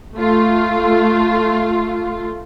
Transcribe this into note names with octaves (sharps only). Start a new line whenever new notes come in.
A3 F4